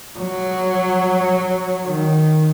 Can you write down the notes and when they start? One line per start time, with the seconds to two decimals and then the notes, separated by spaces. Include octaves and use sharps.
0.19 F#3
1.87 D#3